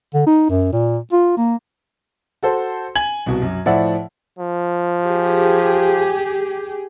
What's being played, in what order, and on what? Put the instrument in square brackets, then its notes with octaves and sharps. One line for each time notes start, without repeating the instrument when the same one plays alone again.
[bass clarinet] D3
D#4
F#2
A#2
F4
A#3
[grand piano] F#4 A4 C5
G#5 G#6 F#7
C2 B2
F#2
A2 F3 D5 E5 F#5
[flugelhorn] F3
[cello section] G4 G#4